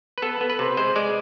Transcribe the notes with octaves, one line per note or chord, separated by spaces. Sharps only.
B4
B3 A4
B3
B4
C3
G#3 C5
G#3 D5